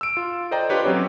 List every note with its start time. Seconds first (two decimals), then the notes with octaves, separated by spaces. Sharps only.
0.01 E6 D7
0.17 F4
0.51 A4 C5 D5 D#5 G5 A#5
0.69 D4 F4 G4 B4 C#5
0.83 F#3 C4 C#4 G4 C5 C#5